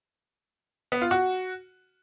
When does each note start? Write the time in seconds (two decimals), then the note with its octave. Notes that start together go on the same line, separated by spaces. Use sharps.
0.92 B3
1.01 F4
1.11 F#4